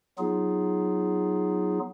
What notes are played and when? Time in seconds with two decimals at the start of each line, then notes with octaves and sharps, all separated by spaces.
0.19 F#3 B3 D#4 F4 G#4